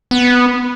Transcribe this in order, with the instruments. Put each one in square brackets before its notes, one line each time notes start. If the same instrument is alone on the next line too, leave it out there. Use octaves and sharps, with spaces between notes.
[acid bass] B3